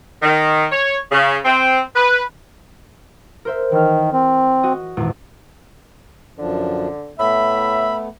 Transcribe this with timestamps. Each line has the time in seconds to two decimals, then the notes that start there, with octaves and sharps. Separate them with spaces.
0.22 D#3
0.72 C#5
1.12 C#3
1.45 C4
1.96 B4
3.45 A#4 C5 E5
3.72 D#3 E3 F6
4.13 C4
4.63 F#4 D#5
4.97 G#1 E2 A#2
6.38 F#2 D3 F3 D4
7.19 A2 A3 B3 E5 B5